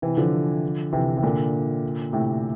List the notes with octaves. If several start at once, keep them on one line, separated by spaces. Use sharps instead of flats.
C3 E3
D3 F3
C3 E3
C3
A#2 D3
A2 C3